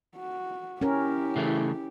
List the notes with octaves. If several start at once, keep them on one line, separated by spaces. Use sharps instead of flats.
F#4
C#4 E4 G4 A#4
C#3 E3 A3